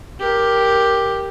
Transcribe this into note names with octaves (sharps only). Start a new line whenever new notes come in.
G4 A#4